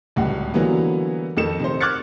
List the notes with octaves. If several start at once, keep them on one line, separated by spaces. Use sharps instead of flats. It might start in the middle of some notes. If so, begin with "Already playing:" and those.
D1 C#2 G3 F#5
D3 E3 F#3 G3 A#3 B3
F2 D#3 A4 C#7 E7
C3 D#3 C5
D6 F6 F#6 G#6 A6 C#7